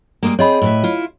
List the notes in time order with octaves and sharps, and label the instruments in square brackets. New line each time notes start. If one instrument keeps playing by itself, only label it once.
[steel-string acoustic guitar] G3 G#3 A#3
[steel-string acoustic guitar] C4 G#4 [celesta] C#5 D#5 B5
[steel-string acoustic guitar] A2 B4 E5
E4 F4